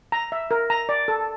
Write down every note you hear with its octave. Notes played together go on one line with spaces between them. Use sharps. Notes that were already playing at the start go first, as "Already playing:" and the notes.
A#5
E5
A#4
A#5
D5
A4